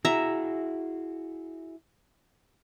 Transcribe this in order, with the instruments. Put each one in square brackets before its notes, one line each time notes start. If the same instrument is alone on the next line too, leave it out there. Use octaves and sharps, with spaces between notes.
[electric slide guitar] E4 F#4 G#4 [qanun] E5 A#5